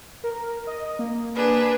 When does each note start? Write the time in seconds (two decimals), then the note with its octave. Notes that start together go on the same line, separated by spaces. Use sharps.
0.24 A#4
0.67 D#5
0.99 A#3
1.35 D4 G#4 B4